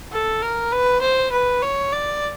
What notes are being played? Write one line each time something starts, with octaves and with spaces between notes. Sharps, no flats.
A4
A#4
B4
C5
B4
C#5
D5